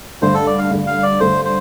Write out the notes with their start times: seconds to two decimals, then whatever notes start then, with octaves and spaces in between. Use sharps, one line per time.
0.22 G2 D3 A3 C5
0.34 A4
0.47 D5
0.58 F5
0.71 G2 D3 A3
0.87 F5
1.03 D5
1.20 G2 D3 A3 C5
1.45 C5